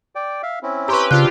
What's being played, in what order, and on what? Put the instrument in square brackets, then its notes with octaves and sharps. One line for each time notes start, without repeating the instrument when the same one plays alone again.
[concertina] D5 G5
E5 F5
C4 C#4 E4
[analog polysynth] G4 B4 [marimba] A#5 C6 C#6
[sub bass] C#3 [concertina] C4 D4 F5 [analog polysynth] F4 G4 [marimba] F#6